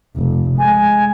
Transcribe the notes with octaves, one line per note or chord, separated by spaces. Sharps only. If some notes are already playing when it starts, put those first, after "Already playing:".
F1
G#3 G#5